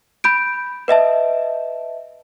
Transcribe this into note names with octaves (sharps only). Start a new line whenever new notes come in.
B5 G6 D7
B4 D#5 E5 A5